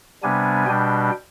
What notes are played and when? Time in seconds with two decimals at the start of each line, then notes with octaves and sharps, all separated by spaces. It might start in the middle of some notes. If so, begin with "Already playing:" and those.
0.23 C3 G3 B3 D4 G#5
0.66 B2 G3 D4 G5